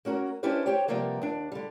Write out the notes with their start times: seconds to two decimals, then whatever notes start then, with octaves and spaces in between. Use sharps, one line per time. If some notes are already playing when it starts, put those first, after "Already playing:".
0.05 A#3 C#4 F#4 A4 A#4
0.43 C#4 D4 E4 G4 B4 C5
0.66 G4 C5 C#5 G5
0.88 C3 E3 F3 G3 A#3 B3
1.22 D#2 D4
1.52 D3 G3